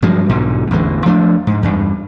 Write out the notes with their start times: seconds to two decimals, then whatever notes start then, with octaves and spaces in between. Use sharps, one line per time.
0.02 G2 F3 F#3 G#3
0.29 B1 G#2 B2 D3
0.71 A1 E2 D3 G#3
1.06 F3 A3 D4
1.47 G#2
1.63 E2 G2